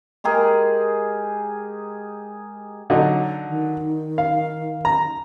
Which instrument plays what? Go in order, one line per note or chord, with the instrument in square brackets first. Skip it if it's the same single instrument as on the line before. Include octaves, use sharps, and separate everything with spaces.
[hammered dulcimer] G#3 G4 G#4 A#4
[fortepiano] D3 F#3 D#4
[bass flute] D#3
[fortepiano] F5
A#5